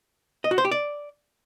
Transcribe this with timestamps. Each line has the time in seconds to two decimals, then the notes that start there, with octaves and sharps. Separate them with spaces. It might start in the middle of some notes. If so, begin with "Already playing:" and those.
0.44 D#5
0.51 F#4
0.58 C5
0.65 G4
0.71 D5